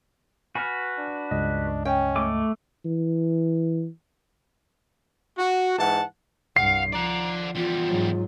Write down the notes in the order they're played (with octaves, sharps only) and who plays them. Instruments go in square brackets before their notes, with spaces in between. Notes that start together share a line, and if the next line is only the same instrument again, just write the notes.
[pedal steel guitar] F#4 B4 [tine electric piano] G#5 F6
[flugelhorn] D4
[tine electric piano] C#2 G2 D#5
[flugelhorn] C#4 [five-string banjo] G5
[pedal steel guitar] A3 D6
[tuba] E3
[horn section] F#4
G#2 E3 F#5 A5
[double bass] C2 G2 [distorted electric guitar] F5 [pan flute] F#5 [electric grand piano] C7
[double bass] F3 [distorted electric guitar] D5 F#5 [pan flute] A#5
[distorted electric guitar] E2 G3 [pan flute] F4
[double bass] G#2 F#3